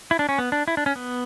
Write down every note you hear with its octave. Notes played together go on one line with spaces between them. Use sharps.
E4
D4
C#4
B3
D4
E4
D4
C#4
B3